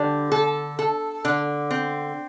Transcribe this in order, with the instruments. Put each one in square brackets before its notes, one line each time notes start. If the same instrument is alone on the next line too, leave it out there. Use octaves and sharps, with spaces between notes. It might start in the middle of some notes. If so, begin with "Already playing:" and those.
Already playing: [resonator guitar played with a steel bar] D3 G3
A4
A4
D3
C4